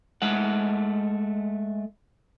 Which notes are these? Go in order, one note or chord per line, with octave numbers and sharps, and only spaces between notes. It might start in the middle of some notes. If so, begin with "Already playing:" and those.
G#3 A3 F#5